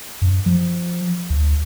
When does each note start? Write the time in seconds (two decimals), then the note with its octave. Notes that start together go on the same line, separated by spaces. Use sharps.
0.22 F#2
0.46 F3
1.30 D2